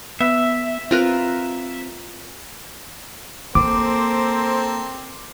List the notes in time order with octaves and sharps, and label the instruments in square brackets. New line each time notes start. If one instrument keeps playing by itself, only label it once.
[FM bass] B3 [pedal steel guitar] E5
[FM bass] C4 [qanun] F4 A#4 B4
[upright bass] A#3 [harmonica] C4 [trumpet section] A4 A#4 C5 [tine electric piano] D6